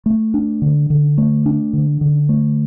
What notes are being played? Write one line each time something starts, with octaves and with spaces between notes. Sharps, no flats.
A3
D4
D3
D3
A3
D4
D3
D3
A3